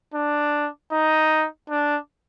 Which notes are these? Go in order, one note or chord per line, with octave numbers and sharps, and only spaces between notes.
D4
D#4
D4